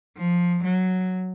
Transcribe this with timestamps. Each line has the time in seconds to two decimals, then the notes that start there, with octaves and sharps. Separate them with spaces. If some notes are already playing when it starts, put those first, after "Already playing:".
0.18 F3
0.65 F#3